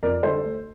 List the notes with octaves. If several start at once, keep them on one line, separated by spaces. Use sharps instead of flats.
F2 A#4 D5
D3 G3 A4 C5
D2